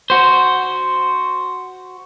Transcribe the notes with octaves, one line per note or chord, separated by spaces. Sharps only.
F#4 C5